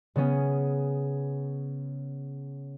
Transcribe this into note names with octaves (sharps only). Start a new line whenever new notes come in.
C#3 B3 C#4 G#4